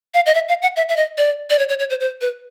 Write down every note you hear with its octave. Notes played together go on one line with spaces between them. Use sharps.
F5
D#5
E5
F5
F#5
E5
E5
D#5
D5
D5
C#5
C#5
C#5
C5
C5
B4